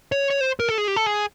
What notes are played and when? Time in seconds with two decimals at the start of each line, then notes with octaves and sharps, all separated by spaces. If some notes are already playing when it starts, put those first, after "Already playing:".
0.12 C#5
0.30 C#5
0.41 C5
0.60 A#4
0.69 A4
0.78 G#4
0.88 G4
0.97 A4
1.06 G#4